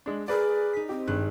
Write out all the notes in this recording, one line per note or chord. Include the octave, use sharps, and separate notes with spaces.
G#3 D4
G#4 A#4 B4 D5
D#4 B6
C4 G4
G#1 G2 F#6